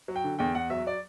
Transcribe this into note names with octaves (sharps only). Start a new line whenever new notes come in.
F#3
G5
D3
E2 G5
E2 F#5
F#3 E5
D5